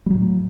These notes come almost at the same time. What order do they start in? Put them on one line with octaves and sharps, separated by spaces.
G3 F#3 A2